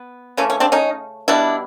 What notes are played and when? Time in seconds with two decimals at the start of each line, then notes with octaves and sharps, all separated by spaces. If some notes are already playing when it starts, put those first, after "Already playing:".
Already playing: B3
0.37 C#3 E3 A3 C#4
0.50 C#4
0.60 C4 D4
0.72 C#4 D#4
1.28 B2 G3 B3 D4 E4